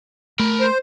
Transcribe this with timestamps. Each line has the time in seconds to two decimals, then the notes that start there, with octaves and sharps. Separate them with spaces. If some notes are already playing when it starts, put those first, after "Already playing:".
0.39 A3 A#4 B5
0.60 C5